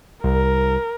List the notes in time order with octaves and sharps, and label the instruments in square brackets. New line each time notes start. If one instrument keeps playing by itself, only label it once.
[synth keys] C2 [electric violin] A#4